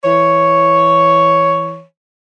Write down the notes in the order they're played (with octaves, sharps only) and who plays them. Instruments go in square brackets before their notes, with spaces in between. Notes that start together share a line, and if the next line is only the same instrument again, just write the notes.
[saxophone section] E3 C#5